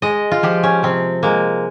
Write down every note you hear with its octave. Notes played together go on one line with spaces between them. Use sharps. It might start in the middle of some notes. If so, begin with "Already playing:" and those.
G#3 D#5
F4
F3 G4
C#4
C3 C4
G#3 A#3